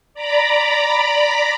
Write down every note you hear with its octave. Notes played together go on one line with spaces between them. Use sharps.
D5 A#5 B5 D6